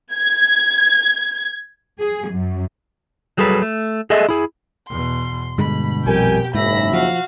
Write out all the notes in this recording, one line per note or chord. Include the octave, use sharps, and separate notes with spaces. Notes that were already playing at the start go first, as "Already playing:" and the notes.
G#6
G#4
F#2
F#3 G3 G#4 A4 B4
A3
G#4 A4 D#5 E5
E4 G#4
E2 B2 C6
G2 B2 D3 G#3 B5
A#1 F2 G3 G4 A#4 G5 G#5
F#1 D#2 G#2 E5 B5 A#6
F3 F#4 F5